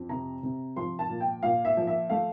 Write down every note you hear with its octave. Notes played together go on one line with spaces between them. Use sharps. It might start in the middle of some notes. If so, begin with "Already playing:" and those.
Already playing: F2
C3 A#5
C3
F3 C6
A5
A#2
G5
A#2 F5
E5
F3
E5
A3 F5